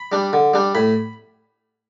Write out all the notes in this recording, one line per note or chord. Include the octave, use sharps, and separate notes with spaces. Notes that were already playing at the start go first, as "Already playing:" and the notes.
Already playing: B5
G3 D4
D3
G3 D4
A2 B5